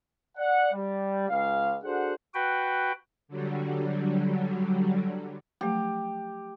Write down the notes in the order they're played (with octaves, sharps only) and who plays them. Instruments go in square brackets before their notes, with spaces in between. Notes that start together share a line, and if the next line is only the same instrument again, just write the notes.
[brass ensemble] D5 F#5
G3
C#2 F5
D4 F#4 G#4 A4 C5 F#5
[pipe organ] F#4 B4 G5
[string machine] D3 F#3 G3
[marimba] F3 F#3 A3 [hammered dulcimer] G4